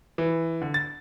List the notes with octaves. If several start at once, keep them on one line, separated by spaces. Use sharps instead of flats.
E3
D3
A6